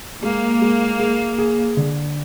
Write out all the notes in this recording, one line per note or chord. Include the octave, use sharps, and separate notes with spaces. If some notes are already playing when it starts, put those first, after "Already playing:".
G#3 A#3
G#3
G#4
G#4
D3